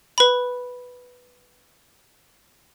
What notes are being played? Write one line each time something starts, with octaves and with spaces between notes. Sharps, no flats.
B4 B5